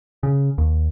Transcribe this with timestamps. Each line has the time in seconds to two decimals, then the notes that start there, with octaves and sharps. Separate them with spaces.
0.23 C#3
0.58 D#2